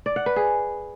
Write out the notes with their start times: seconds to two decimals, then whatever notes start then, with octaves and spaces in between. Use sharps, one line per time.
0.06 D5
0.16 F#5
0.26 B4
0.36 G#4